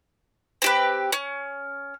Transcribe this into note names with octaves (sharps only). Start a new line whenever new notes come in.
C4 G4 B4
C#4